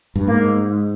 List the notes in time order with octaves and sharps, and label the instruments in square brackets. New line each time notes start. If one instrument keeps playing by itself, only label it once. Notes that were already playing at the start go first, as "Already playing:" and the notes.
[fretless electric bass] G2
[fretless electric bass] G#2 [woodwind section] A#3